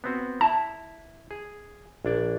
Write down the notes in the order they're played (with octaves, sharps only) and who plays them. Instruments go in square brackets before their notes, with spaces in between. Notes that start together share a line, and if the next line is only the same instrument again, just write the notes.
[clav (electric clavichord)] B3 C4 F#4
[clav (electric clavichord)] E4 E5 [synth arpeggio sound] A5
[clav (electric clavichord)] G#4
A#1 D4 D5